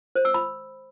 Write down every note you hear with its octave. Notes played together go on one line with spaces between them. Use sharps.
C5
E6
B5